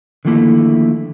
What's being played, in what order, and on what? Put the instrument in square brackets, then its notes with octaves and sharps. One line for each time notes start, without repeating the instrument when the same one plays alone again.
[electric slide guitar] D3 D#3 F3 A3 A#3 E4